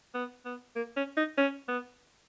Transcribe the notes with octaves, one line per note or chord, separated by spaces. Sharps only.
B3
B3
A#3
C#4
D#4
C#4
B3